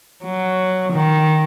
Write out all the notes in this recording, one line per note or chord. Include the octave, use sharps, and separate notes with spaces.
F#3
D#3